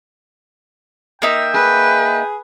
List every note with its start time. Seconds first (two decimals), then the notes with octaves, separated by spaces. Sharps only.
1.22 A#3 D#4 E5 G5
1.54 G#4 B4